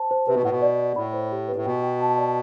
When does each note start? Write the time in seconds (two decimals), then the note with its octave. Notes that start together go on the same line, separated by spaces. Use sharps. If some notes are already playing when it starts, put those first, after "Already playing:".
Already playing: C5 A5
0.11 C5
0.28 C3 B4
0.35 B2
0.43 A2 F#5
0.51 B2
0.62 D5
0.80 D5
0.96 A2 B5
1.14 C5
1.32 G4
1.48 B4
1.56 A2
1.65 B2 G5
1.83 G5
2.01 A5
2.18 D5